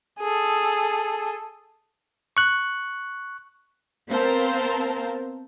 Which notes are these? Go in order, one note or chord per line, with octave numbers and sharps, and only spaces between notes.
G#4 A4
C#6 F#6
B3 C4 A#4 C5 F5 A5